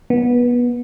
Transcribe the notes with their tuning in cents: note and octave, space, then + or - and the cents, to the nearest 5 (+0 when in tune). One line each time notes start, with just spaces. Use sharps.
B3 -20